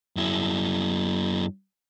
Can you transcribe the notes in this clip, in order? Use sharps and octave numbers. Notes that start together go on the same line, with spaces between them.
F#2 E4